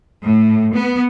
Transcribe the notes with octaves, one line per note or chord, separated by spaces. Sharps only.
A2
B3